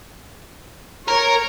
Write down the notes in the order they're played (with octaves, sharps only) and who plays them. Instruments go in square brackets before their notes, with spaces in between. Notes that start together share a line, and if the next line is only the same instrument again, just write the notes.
[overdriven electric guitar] A#4 [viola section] C#5